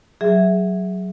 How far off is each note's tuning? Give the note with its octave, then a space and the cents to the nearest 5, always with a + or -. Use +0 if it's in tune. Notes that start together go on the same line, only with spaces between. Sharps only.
F#3 +15 G#4 +0 E5 +0